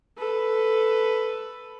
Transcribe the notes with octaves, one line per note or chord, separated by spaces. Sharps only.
A4 B4